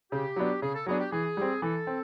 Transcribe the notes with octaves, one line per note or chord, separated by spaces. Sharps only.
C#3 G4
F#3 B3 D4
C#3 G#4
A4
F#3 B3 D4 G#4
G4
E3 G#4
G3 C4
E3 A4
C4